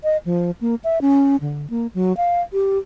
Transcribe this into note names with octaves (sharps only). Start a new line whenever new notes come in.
D#5
F3
A#3
E5
C#4
D3
A#3
F#3
F5
G4